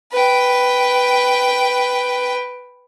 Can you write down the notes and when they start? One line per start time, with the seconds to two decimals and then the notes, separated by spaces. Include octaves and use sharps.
0.12 B4 G5